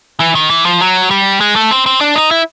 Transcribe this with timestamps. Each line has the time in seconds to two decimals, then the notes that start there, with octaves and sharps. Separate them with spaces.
0.20 E3
0.35 D#3
0.50 E3
0.65 F3
0.81 F#3
1.11 G3
1.40 G#3
1.56 A3
1.71 C4
1.86 C4
2.01 D4
2.16 D#4
2.31 E4